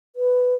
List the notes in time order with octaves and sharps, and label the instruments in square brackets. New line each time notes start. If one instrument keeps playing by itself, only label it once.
[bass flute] B4